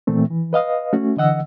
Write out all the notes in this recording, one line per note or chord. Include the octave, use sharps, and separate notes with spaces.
A#2 E3 A3 C4
E3
B4 D#5 F5 D#6
A3 C#4 F#4
D3 E3 D#5 F#5 E6